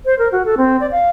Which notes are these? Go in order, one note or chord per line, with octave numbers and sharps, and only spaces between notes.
C5
A#4
F#4
A4
C4
D5
F5